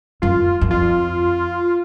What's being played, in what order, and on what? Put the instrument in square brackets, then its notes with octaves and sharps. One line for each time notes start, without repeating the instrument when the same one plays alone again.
[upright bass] F#2 [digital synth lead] F4
[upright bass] F#2
[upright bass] F2 [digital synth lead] F4